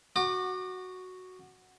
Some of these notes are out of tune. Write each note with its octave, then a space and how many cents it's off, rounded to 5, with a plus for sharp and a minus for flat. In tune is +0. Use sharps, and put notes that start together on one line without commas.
F#4 +0 D6 +35